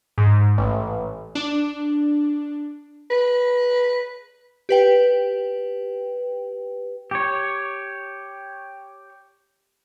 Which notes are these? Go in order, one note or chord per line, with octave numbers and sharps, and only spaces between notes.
G#2
A1
D4
B4
G4 B4 G5
G4 C#5